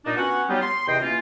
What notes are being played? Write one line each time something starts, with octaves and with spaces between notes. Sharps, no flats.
A#2 D4 D#4
B3 C#4 F#4 F#5
F#3 G3 B3 D#4 F4 G4
C6
E2 C3 D#5 G5
E3 A#3 C#4 F4